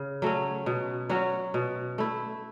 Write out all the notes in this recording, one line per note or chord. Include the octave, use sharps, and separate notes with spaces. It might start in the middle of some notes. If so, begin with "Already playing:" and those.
Already playing: C#3
F#3 A3 C#4
B2
F#3 C#4 F#4
B2
A3 E4